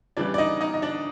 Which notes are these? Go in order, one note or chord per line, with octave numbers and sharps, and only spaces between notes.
C#3 E3 G3 D4 D5
D5
D#4 D#5
D#4 D#5
D#5
D4 D5